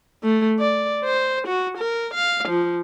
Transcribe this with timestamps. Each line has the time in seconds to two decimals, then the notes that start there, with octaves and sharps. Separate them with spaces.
0.23 A3
0.59 D5
1.04 C5
1.48 F#4
1.78 A#4
2.14 F5
2.49 F3